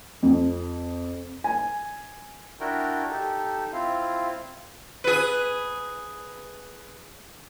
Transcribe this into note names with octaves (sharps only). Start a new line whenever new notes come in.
F2
G#5
D4 E4 F#4 A#4 G5
D#4 G4 A4
C4 E4 F4 F5
G#4 B4